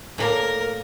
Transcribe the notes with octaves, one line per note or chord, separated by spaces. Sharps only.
A2 A#3 A#4 D5